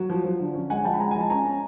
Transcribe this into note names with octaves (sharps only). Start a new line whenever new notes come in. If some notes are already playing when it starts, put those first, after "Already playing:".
Already playing: F#3
F3
F3
D3
C#4
G#3 F#5 G#5
F3 G5 A5
B5
G#3 G#5 A#5
F3 G#5
A5
C#4 G#5 A#5
C#4